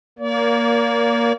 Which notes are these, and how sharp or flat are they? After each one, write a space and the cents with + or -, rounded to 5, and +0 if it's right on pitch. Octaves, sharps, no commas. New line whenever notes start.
A#3 +5 D5 -40